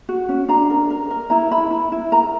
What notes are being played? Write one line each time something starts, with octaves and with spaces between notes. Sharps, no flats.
F#4
C#4
D4 A#5
A#4
A#4
A#4
E4 A#5
E4 B5
E4
E4
A#4 A#5